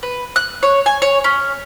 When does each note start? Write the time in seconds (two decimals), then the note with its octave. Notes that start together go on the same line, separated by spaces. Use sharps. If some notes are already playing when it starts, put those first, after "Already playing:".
0.03 B4
0.36 F#6
0.63 C#5
0.86 G#5
1.02 C#5
1.24 C#4